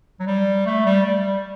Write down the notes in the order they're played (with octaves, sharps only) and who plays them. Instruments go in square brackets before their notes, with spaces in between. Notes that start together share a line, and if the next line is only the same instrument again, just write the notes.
[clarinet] F#3
G3
A3
G3
G3